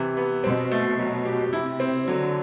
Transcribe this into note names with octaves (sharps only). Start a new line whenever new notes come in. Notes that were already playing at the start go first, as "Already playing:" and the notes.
Already playing: C3 E3
B3
B2 C4
A3
F#3
G4
C3 E4
C4
D3 F#3